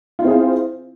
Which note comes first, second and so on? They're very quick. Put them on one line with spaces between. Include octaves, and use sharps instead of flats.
F4 E4 C4 G#4 C5